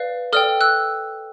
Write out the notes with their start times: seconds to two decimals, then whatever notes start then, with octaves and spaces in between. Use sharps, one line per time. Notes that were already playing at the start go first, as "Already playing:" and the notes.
Already playing: B4 D5 F5
0.33 A4 D5 G5 D#6 F6
0.61 E6 F#6